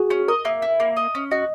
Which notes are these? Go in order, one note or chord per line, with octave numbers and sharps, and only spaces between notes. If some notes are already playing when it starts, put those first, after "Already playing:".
Already playing: F#4 G#4
C#4
A#4 D#5
A#3 E5
E4
A#3
D#5
C#4
F#4 D#5